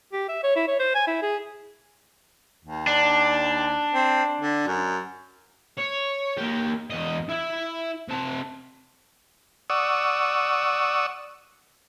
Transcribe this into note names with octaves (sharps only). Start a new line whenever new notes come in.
G4
E5
C#5
E4
C#5
C5
G#5
E4
G#4
D#2
D4
C4
D3
F#2
C#5
A#3 G4
E2 D#5
E4 E5
C3 A5
D5 F#5 C#6 D#6 E6